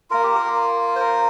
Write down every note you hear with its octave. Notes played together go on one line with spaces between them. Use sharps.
A#3 F4 A#4
G4
A#4
C5
A#4